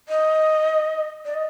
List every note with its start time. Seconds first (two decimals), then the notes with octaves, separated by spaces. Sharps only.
0.09 D#5
1.25 D5
1.34 D#5